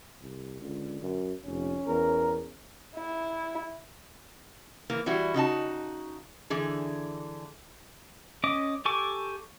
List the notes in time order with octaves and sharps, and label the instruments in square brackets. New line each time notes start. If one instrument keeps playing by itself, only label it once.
[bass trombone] C2
[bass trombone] C#2 [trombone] D3
[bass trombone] F#2
[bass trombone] F1 [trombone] F2 [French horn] C#4
[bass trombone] E2 [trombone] A#4
[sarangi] E4
[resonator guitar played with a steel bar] E3 A#3
E3 G3 E4 F#4
C#3 D#4 F#4 A5
D3 E3 G#4
[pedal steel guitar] C#4 D#5 D6
G4 A4 G#5 C#6 D6